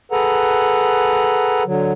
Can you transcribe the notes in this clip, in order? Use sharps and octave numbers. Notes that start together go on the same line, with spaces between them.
G#4 A4 B4 F#5 A#5
D3 F#3